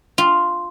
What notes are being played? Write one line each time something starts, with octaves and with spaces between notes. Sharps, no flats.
F4